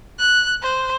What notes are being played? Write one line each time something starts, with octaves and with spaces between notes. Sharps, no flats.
F#6
C5